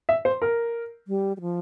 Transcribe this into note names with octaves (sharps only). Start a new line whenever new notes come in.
E5
C5
A#4
G3
G3
F3